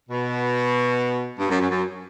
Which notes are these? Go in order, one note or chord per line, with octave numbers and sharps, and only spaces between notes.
B2
G2
F#2
F#2
F#2